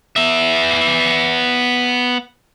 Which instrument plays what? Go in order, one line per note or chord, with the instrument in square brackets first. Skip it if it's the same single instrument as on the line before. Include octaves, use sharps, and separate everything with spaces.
[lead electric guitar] B3 E5